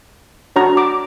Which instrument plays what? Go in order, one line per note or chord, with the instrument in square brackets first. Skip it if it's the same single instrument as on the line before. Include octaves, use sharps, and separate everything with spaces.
[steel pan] D4 F#4 C#5 A#5
D6